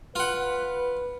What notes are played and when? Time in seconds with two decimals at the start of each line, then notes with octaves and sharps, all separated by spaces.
0.15 F4 B4 F#5